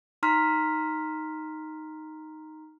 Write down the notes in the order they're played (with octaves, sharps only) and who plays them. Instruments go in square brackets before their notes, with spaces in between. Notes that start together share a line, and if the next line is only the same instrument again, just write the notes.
[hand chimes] D#4 A#5 C6 F6 B6